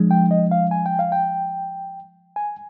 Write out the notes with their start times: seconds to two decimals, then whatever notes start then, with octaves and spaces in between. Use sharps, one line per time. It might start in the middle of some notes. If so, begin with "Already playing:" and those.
Already playing: F3 G#3 D4
0.11 G5
0.31 D#5
0.51 F5
0.71 G#5
0.86 G5
0.99 F5
1.12 G5
2.36 G#5